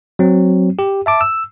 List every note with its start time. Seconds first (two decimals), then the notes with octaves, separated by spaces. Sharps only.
0.19 F#3 C4
0.79 G4
1.06 E5 A5 D6
1.21 E6